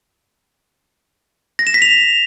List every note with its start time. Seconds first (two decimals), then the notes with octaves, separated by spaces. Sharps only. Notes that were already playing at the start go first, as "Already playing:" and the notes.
1.59 A#6
1.67 E7
1.74 B6
1.82 F7